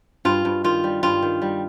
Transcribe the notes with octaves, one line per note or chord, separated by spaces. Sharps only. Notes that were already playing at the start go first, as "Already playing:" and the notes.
G2 F4
G2
D#3 F4
G3
G2 F4
D#3
G3